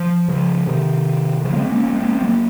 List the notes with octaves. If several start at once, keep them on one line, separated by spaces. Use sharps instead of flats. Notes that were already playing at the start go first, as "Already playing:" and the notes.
Already playing: F3
C#3 F3
C3 D#3
C#3 F3
A#3
G#3 C4
A#3 C#4
A#3 C#4
G#3 C4
A#3 C#4
G#3 C4
F#3 A#3